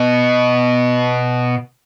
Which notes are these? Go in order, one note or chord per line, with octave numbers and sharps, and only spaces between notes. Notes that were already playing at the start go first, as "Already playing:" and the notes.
Already playing: B2